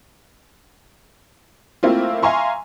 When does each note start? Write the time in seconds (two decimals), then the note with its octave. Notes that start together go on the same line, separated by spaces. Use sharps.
1.83 A3 A#3 C4 E4 F4
2.23 E5 F5 G#5 A#5 C6 C#6